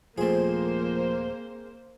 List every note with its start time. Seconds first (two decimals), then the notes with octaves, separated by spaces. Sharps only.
0.18 D#1 F3 A3 A#3 C4 G#4 C5